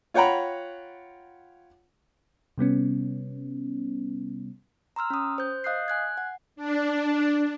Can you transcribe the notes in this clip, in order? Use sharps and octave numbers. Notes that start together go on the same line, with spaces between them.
F4 C#5 F#5 G5 A#5 B5
C3 G3 B3 C#4
A#5 C6 E6 F6
C#4 D#6
C5 G6
D#5 F5 D#6 F#6 G6 C7
G#5 F#6 G#6
F#5
D4